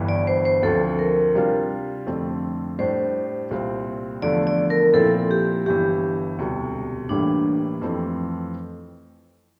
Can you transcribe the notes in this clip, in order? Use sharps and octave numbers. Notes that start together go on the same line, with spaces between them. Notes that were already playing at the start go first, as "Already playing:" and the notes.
Already playing: G1 G2 E3
D5
C5
C5
D2 D3 F3 C4 A4
A#4
C3 G3 D4 F4
F2 D3 A3 C4
A2 G3 D4 G4 C5
C2 A#2 G3 C4 F4
E2 D3 F3 A3 D5
D5
A#4
A#2 F3 C4 E4 A4
G4
G1 G2 E3 G4
E1 D2 C3 G3
A1 A2 E3 G3 A#3 D4
F2 E3 A3 C4